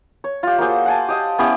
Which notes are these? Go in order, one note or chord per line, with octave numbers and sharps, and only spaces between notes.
C#5
F4 G4
A#3 F#4 G#4 C5
F#5 G#5 A5
G4 D#5 F5
B3 C#4 E4 G4